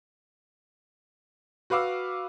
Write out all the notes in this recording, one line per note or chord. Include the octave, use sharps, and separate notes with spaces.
F#4 B4 F5 D6 E6